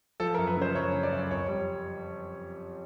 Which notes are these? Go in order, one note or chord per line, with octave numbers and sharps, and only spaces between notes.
F3 A4
A#4
F#2
B4
C#3
C5
F#2 C#5
C#3
D5
F#2
F2 C#5
G3